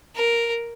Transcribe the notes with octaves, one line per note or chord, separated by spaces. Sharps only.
A#4